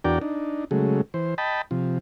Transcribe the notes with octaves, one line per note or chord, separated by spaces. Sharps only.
E2 D4 F#4 A#4 D5 G5
D4 D#4
C#3 F#3 G#3 A3
E3 C5
D#5 G5 A5 B5
C3 F3